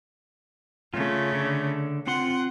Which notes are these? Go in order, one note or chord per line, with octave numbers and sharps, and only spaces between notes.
C#3 A3 F4
D3
C4 F4 F#5 C6